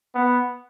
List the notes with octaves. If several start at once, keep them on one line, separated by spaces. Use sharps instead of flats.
B3